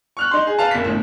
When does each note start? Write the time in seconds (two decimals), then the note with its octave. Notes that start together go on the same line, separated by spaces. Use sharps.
0.17 C#6 F6 F#6
0.31 D#4 C6
0.47 G#4
0.59 B4 F5 A5
0.71 F#1 B6
0.84 G1 A2